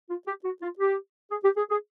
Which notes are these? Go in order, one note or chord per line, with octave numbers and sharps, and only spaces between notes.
F4
G4
F#4
F4
G4
G#4
G4
G#4
G#4